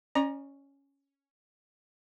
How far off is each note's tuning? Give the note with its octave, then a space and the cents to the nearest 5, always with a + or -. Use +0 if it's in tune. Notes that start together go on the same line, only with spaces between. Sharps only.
C#4 +0 D5 +45 A#5 +20